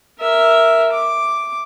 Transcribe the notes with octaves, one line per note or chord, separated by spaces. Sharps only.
A#4 E5
D6